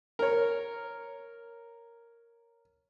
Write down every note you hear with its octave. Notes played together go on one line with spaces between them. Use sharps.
A#4 C#5